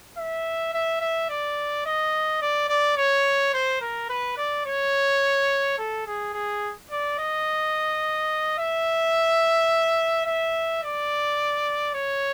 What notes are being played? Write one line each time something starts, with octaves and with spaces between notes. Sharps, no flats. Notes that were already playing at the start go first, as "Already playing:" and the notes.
E5
E5
E5
D5
D#5
D5
D5
C#5
C5
A#4
B4
D5
C#5
A4
G#4
G#4
D5
D#5
E5
E5
D5
C#5